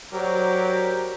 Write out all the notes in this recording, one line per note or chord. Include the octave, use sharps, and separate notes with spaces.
F#3 G4 A#4 C5 D5